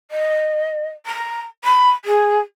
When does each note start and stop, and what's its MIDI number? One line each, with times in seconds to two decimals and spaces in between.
0.11 0.88 75
1.06 1.42 82
1.64 1.89 83
2.05 2.38 68